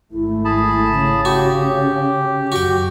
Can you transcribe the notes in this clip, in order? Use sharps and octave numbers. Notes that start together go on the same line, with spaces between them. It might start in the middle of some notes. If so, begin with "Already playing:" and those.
G#1 A3 E4
G#4 A5 B5
C#3
C#4 F#4 G4
F#2 F#4 G5